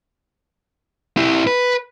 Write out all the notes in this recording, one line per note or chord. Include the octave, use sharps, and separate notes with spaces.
E4 G4
B4